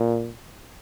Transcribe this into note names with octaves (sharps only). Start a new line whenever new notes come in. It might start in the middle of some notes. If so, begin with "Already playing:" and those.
Already playing: A#2